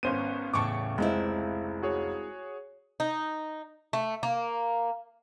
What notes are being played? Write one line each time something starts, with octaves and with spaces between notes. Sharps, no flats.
G#1 B3 C#4 C5 D#7
E2 A2 C#3 A5 C#6 D6
F1 C#2 G#3 C4 E4
F#4 G#4 C#5
D#4
A3
A#3